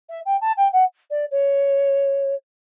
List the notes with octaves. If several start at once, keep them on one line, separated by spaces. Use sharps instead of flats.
E5
G5
A5
G5
F#5
D5
C#5